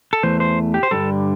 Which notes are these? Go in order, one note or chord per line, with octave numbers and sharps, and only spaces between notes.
A4
E2 E3 A3 C5
C5
G4
C5
G2 D3 G3 A4